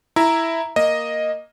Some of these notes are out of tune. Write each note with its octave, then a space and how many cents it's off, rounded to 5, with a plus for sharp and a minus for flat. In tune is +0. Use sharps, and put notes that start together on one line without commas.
E4 +0 E5 +0 A#5 +0
A#3 +0 D#5 +0